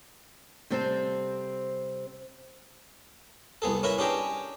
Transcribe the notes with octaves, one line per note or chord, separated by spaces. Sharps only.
C3 G3 C4 A4 C5
C2 B3 G#4 A4
C#4 E4 A#4 B4 F#5
C#4 D4 G4 G#4 G5 A#5